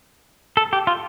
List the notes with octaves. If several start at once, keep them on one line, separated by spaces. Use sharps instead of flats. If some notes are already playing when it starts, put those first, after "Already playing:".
A4
G4
F4